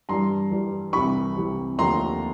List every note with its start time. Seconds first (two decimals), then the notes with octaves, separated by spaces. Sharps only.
0.09 G2 E3 G3 A#5 C6
0.51 G2 E3 G3
0.93 C2 C3 E3 B5 C#6
1.35 C2 C3 E3
1.78 D#2 D3 F3 A3 A#5 C6